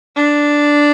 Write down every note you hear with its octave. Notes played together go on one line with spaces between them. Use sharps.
D4